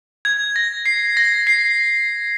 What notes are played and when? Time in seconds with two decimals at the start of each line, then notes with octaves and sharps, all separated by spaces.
0.25 G#6
0.56 A#6
0.86 C7
1.17 A#6
1.47 C7